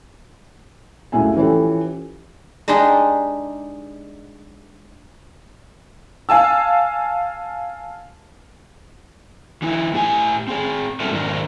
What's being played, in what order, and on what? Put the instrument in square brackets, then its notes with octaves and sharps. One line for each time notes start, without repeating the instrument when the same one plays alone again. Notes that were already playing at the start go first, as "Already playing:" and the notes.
[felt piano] C#2 F#2 A2 E4 F#4 G#5
E3 F3 C#4 G4 A4
[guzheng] G#3 D4 D#4 G4 G#4
[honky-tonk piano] F5 G#5 A5 E6
[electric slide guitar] E3 D#4 E4
A2 G4 G#5
C4 G#4
F#3 G3 C#4 A4 A#4 E5
G#2 D#3 D4 A#4